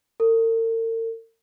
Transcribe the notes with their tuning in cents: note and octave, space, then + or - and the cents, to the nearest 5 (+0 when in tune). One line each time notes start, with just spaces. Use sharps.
A#4 -45